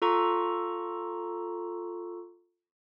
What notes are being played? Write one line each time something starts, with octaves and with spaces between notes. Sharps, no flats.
F4 A4 A#5 C#6